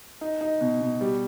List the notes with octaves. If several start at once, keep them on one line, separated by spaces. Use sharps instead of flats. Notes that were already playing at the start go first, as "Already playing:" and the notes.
D#4
D#4
B2
B2
G3